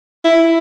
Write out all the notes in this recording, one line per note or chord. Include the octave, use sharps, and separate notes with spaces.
E4